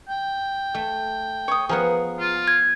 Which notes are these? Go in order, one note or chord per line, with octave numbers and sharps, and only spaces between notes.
G5
A3
C#5 D#6
F3 B3 G#4 A#4 F#5
F4
G#6